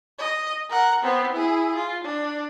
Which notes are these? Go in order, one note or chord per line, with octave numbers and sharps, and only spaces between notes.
D#5
A#4 F#5
B3 C4
E4 G#4
F4
D4